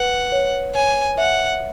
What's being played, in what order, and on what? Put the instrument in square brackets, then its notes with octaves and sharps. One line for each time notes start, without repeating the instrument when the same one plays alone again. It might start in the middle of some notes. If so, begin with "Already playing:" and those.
Already playing: [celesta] B4 [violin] F#5
[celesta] C#5
[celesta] C#5 [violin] G#5
[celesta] E5 [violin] F#5